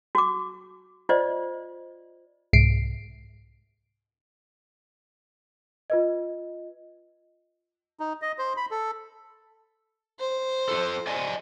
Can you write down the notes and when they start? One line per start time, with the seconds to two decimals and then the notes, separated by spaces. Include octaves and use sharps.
0.15 F#4 D6
1.09 F4 C5 D5 D#5
2.53 C2 G#2 C7 D7
5.90 F4 B4 D#5
8.00 D#4
8.22 D#5
8.38 C5
8.57 B5
8.71 A4
10.20 C5
10.69 F4 A4
11.07 D5 D#5 G#5